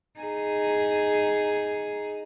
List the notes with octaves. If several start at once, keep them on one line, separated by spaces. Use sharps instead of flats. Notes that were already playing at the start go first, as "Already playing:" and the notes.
D#4 G#4